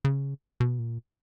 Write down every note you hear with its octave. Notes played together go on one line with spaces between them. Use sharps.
C#3
B2
A#2